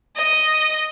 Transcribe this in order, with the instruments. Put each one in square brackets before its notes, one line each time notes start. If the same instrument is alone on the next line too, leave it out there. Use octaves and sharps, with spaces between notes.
[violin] D#5